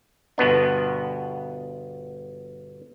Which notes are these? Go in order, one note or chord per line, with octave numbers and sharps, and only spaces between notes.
G1 B2 B3 D4